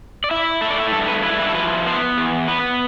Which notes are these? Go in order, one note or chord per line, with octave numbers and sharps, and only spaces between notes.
D5
E4 E5
A3 E5
D5
E5
G2 A4
B4
E4 B4
B4
A4
F3 B4
B3 C5
E2
B3 B4